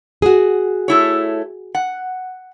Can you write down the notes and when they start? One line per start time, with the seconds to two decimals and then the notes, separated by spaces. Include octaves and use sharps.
0.22 F#4 G#4
0.88 A3 E4 C#5
1.75 F#5